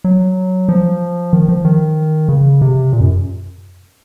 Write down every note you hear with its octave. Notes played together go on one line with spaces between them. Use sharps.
F#3
F3
D#3
F3
D#3
C#3
C3
A#2
F#2